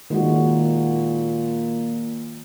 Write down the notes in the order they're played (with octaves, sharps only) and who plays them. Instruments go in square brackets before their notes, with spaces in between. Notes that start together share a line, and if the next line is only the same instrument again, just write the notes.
[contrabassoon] A#2 [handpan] D#3 G#3 F#4